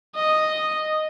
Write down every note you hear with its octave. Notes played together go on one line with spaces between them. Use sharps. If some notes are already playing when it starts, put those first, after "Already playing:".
D#5